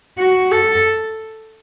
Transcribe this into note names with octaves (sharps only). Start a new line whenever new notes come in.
F#4
A4